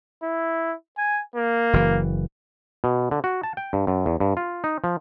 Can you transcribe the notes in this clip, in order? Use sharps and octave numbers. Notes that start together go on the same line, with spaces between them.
E4
G#5
A#3
F#1 E3
B2
D3
F#4
A5
G5
G2
F#2
E2
G2
F4
D#4
F3